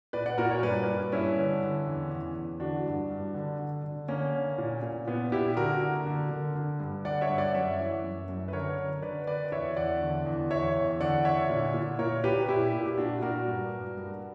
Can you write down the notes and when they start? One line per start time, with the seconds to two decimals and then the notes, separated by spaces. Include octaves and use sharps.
0.13 A#2 B4 D5
0.26 D5 F#5
0.38 A#2 F#4 A#4
0.51 A#4 C#5
0.63 G2 B4 D5
0.88 G2
1.12 G2 C#4 E4
1.37 D3
1.62 D3
1.87 E2
2.11 E2
2.36 E2
2.60 D3 D4 F#4
2.85 G2
3.10 G2
3.34 D3
3.59 D3
3.84 D3
4.08 D3 A#3 C#4
4.34 D3
4.58 A#2
4.83 A#2
5.07 A#2 B3
5.32 A#2 E4 G4
5.57 D3 F#4 A#4
5.82 D3
6.06 D3
6.31 D3
6.55 D3
6.80 G2
7.05 D3 D5 F#5
7.21 C#5 E5
7.29 G2
7.38 D5 F#5
7.54 F#2 C#5 E5
7.79 E3
8.04 F#2
8.29 F#2
8.48 B4
8.53 D3 A#4 C#5
8.78 D3
9.02 D3 B4 D5
9.27 D3 B4 D5
9.52 E2 C#5 E5
9.76 E2 D5 F#5
10.01 D3
10.26 E2
10.50 E2 C#5 E5
10.75 E2
11.00 D3 D5 F#5
11.25 D3 C#5 E5
11.50 A#2
11.74 A#2
11.99 A#2 A#4 C#5
12.24 A#2 G4 B4
12.48 A#2 E4 G4
12.73 A#2
12.86 G4
12.98 A#2 D4 F#4
13.22 A#2 F#4 A#4
13.47 G2
13.72 G2
13.97 G2